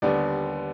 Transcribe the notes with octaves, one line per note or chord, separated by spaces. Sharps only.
D#2 D3 G3 B3 D5